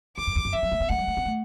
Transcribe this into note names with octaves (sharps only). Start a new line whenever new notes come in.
E2 D6
F#2
E2
F#2
E3 E5
F#3
A3
B3
A3 F#5
G3
A3
B3
A3